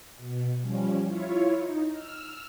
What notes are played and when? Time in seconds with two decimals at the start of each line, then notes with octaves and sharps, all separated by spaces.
0.17 B2
0.61 F3 G3 C#4
1.05 E4 F4 C#5
1.57 D#4
1.91 E6 F6